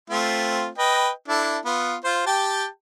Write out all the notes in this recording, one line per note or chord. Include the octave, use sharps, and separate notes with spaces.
A3 C4 F4
B4 D#5 G5
D4 E4 A4
B3 F4
F4 C5
G4 G5 A5